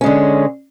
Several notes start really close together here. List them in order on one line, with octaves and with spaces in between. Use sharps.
C#4 G#3 D3